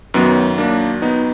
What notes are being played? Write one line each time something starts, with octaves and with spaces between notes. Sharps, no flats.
F#2 D#3 F#3 B3
A#3 D4
B3 D#4